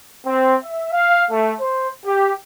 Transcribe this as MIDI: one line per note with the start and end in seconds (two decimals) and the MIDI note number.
0.25 0.56 60
0.63 0.92 76
0.93 1.25 77
1.31 1.53 57
1.60 1.88 72
2.06 2.33 67